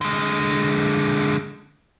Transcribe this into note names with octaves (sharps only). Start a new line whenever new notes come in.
D3 G#3